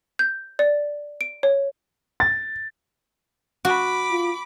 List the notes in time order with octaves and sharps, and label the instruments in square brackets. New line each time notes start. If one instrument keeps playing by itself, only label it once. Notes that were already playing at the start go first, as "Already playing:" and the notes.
[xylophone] G6
D5
D7
C#5
[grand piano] A6
[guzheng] F#4 [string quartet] B5 D6
[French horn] F4